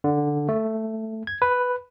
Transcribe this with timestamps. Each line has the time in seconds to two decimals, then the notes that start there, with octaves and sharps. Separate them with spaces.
0.04 D3
0.49 A3
1.27 G#6
1.42 B4